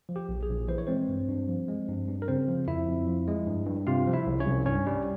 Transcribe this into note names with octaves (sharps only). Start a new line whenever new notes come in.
F3
G4
A#1
G#4
A#1
E3 C5
C#5
G#3 C4 C5
G2
G2
F3
G#3
G2
G2
A#4
C#3 C4 C5
F3
F2 E4 E5
F2
F3
G#3
G2
G2
C3 F4 F5
F3
E4 E5
C2
C#4 C#5
C2
G2 C#4 C#5
G3